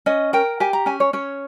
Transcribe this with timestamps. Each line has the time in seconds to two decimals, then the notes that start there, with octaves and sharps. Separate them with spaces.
0.06 C#4 D#5
0.33 A#4 G5
0.60 G4 G#5
0.73 A#5
0.86 C#4 G#5
1.00 C#5
1.13 C#4 C#5